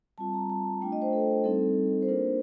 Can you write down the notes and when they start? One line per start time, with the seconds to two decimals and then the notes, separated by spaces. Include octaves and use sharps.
0.18 G3 C4 F4 A5
0.34 A#5
0.50 A5
0.82 A3 D4 F4 G5
0.92 D#5
1.02 C5
1.13 A4
1.44 G3 C4 D#4 A4
2.02 C5
2.08 A#3 D4 F4 A#4